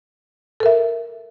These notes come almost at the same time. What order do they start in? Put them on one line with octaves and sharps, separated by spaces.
A4 A#4 E5